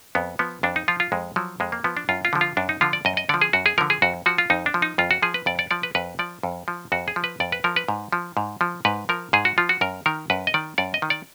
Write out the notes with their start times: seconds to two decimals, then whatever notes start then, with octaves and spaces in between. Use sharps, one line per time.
0.15 F2 B3
0.39 F3 B3
0.63 F2 D4
0.76 D#4
0.88 F3 F4
1.00 F4
1.12 F2 G#3
1.36 F3 F#3
1.60 F2 G#3
1.72 A#3
1.84 F3 B3
1.97 D4
2.09 F#2 F4
2.25 F4
2.33 D3 F3
2.41 F4
2.57 F#2 D4
2.69 D#4
2.81 D3 F3 F4
2.93 D5
3.05 F#2 D#5
3.17 D#5
3.29 D3 F3 D5
3.42 G#4
3.53 F#2 F#4
3.66 G#4
3.78 D3 F3 A#4
3.90 G#4
4.02 F2 F#4
4.26 F3 F#4
4.38 F4
4.50 F2 D#4
4.66 D4
4.74 F3
4.82 D#4
4.98 F2 F4
5.11 F#4
5.22 F3 G#4
5.34 B4
5.46 F2 D5
5.59 D5
5.71 F3 D5
5.83 B4
5.95 F2 B4
6.19 F3 D5
6.43 F2
6.68 F3
6.92 F2 F#4
7.08 G#4
7.16 F3
7.24 B4
7.40 F2 D5
7.52 B4
7.64 F3 A#4
7.76 B4
7.88 G#2
8.13 F3
8.37 G#2
8.61 F3
8.85 G#2 B4
9.09 F3 A#4
9.33 G#2 G#4
9.45 F#4
9.58 F3 F4
9.69 F#4
9.81 F#2 A#4
10.06 D#3 A#4
10.30 F#2 B4
10.47 D#5
10.54 D#3 D5
10.78 F#2 D5
10.94 D#5
11.02 D#3
11.10 D5